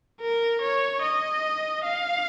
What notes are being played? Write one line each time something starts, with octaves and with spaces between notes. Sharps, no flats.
A#4
C#5
D#5
F5